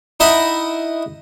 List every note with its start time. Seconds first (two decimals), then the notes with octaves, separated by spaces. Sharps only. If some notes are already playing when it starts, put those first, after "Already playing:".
0.20 D#4 E4 D#5 F#5 B5